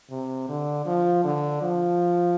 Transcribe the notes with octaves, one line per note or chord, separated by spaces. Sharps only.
C3
D3
F3
D3
F3